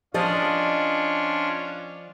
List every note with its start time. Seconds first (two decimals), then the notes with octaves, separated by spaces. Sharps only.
0.14 F3 C#4 D4 F4 D5 D#5